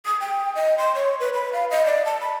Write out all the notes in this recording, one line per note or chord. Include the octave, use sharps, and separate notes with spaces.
D#6
G5
D#5
C6
C#5
B4
B5
F5
D#5
D5
A5
B5